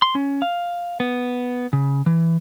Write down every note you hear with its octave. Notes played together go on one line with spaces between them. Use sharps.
C6
C#4
F5
B3
C#3
E3